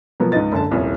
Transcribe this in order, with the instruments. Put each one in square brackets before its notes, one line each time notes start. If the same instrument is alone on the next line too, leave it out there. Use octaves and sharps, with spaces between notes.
[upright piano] B2 F3 F#3 A#3 B3
C#2 G#2 D#4 B4 D#5 A6
F#1 F#2 D3 A5
D#1 C2 F2 C#4 E4